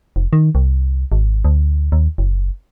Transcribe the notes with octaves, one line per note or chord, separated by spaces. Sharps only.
F1
D#3
C2
G#1
D2
D#2
F#1